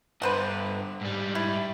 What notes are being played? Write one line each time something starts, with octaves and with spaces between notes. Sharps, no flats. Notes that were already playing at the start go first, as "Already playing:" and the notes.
G2 D3 B4 C5 F#5
G#2 G3
E4